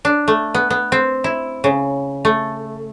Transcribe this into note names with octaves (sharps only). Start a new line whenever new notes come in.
D4
A3
B3
B3
C4
E4
C#3
A3